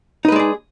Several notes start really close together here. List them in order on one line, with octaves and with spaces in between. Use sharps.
D#4 B4 G#3 D5 G#4